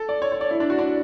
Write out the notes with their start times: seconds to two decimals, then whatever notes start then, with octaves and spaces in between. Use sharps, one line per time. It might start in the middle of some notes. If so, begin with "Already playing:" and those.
Already playing: A4
0.09 D5
0.22 C#5
0.32 C#5
0.41 D5
0.51 E4
0.60 D4
0.70 F#4
0.79 D4